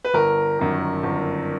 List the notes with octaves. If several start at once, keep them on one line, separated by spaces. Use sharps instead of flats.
B4
G1 A#4
F#2 D#3
G1